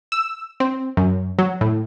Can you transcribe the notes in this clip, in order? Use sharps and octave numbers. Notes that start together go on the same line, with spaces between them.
E6
C4
F#2
F#3
A2